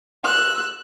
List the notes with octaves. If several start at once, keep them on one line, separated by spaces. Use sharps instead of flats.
E6 F#6